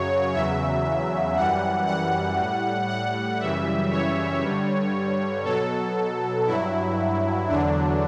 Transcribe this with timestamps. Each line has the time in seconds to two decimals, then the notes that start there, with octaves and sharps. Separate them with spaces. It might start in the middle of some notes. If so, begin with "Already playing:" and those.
Already playing: F#2 C#3 F#3 C#5
0.33 E2 C#3 F#3 E5
1.36 F#2 E3 G3 F#5
1.87 F#5
2.37 A2 G3
2.89 F#5
3.40 F#2 C#3 E3 G3 E5
3.91 C#5
4.42 G2 D3 G3
5.44 B2 F#3 A4
6.46 G2 F#3 E4
7.48 E2 D3 F#3 D4